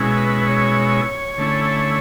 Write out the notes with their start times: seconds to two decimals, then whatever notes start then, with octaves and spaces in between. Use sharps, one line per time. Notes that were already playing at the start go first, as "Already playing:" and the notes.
Already playing: B2 G#3 C#4 E4
0.17 B4
0.47 C#5
1.38 D3 A3 C#4 E4